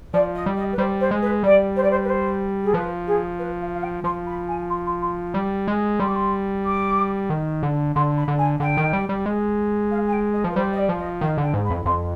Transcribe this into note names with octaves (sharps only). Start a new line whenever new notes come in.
F3 D5
D#5
G3
D#5
B4
G3 C5
C5
G#3
B4
G3 D5
C5
D5
C5
B4
C5
G#4
F3 B4
G#4
B4
F5
F5
G5
F3 C6
B5
G#5
C6
C6
C6
G3
G#3
G3 C6
D6
C6
D6
D#3
D3
D3 C6
B5
D3
G#5
D3 G5
D#3
G3
G3
G#3
F5
G#5
G5
D#5
F3
B4
G3 C5
D#5
D5
F3
D#5
D#3 F5
D3
G5
G#2
B5
F2
F2 C6